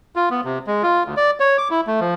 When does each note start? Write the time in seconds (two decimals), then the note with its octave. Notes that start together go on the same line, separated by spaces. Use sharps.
0.16 F4
0.30 B3
0.44 C3
0.67 G#3
0.83 F4
1.05 D2
1.17 D5
1.40 C#5
1.58 D6
1.71 E4
1.87 A3
2.00 F3